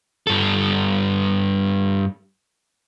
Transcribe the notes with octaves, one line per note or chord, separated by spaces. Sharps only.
G2 A4